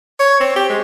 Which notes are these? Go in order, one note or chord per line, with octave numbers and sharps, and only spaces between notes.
C#5
C4
G4
G#3